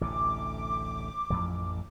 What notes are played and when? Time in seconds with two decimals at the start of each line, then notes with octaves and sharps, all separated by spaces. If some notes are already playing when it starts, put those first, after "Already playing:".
0.01 A1 D2 C3 D6
1.30 A1 F2 F3